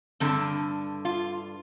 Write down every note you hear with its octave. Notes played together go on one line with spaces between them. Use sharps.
G2 D3 F3 C4
F4